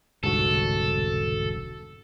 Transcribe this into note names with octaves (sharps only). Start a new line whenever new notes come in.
E1 C2 G#2 D3 F#4 A4